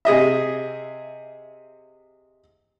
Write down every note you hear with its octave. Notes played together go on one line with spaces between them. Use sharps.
C3 G#4 D#5 E5